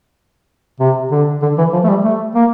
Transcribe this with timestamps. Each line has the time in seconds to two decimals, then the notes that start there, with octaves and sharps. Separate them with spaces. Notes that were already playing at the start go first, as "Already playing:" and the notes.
0.80 C3
1.11 D3
1.42 D3
1.58 E3
1.73 F3
1.84 A3
1.89 G3
2.04 A3
2.35 A#3